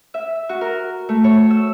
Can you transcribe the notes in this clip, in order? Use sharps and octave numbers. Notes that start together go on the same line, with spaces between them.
E5
F#4
A#4
A3
C#5
E6